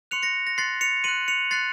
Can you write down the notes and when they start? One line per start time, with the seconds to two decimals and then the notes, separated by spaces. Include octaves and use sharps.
0.11 C6 F#6 C#7 F7
0.23 A#6 C#7
0.47 A#6
0.58 C6 F#6 A6 C7
0.81 C#7 F7
1.04 C6 F#6 D#7 F#7
1.28 C#7 F7
1.51 C6 F#6 A6 C7